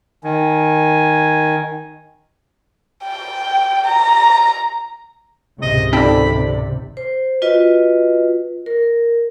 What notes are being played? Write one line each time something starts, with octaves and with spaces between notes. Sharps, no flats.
D#3 G#5
G5
A#5
G#1 C#2 C3 D#5
C4 D#4 A4 D5 G5 A5 B5
C5
F4 F#4 B4 D#5
A#4